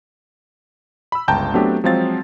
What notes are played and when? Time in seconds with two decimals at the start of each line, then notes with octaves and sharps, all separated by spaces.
1.12 B5 E6
1.28 G1 C#2 G5 A5 A#5 G6
1.54 F#3 A3 B3 C4 D4 G4
1.84 F3 F#3 G#3 C4 F5 A6